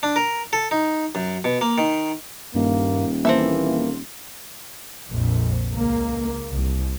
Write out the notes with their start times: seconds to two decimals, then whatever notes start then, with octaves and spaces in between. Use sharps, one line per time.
0.03 D4
0.16 A#4
0.53 A4
0.71 D#4
1.15 F#2
1.44 B2
1.61 A#3
1.78 D#3
2.55 D#1 G2 A#3
3.25 E3 A#3 C4 A4 E5
5.10 A#1 F2
5.74 C#2 A#3
6.53 C2